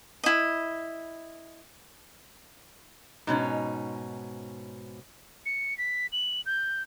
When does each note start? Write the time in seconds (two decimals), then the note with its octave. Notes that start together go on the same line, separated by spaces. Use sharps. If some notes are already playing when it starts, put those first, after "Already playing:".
0.24 E4 D#5
3.27 G#2 B2 C#4 D#4
5.46 C#7
5.78 B6
6.12 F#7
6.46 G6